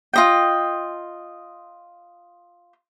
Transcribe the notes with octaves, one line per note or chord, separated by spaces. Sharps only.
F4 D#5 G5